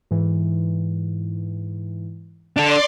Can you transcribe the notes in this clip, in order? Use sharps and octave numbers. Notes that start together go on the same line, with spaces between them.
G#2 E3
D4 A4 D5 C6 D6